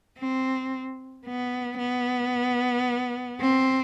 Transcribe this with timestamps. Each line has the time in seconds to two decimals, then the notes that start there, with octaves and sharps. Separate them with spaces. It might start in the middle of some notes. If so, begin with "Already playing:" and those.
0.19 C4
1.25 B3
1.79 B3
3.40 C4